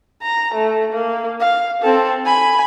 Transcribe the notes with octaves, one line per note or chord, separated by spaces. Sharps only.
A#5
A3
A#3
F5
C4 A4
G#5 B5